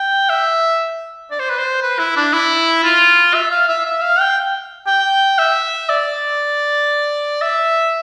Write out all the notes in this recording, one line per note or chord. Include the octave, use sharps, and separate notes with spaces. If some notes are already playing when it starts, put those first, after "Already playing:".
Already playing: G5
E5
D5
C5
B4
C5
B4
E4
D4
E4
F4
E5
F5
E5
E5
F5
G5
G5
E5
D5
E5